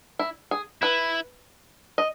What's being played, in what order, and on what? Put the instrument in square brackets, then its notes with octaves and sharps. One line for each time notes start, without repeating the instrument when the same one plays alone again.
[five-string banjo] E4
G#4
[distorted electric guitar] E4 [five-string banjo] B4
[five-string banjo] D#5